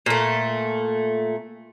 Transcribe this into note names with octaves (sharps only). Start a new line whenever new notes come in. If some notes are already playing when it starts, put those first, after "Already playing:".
A#2 A3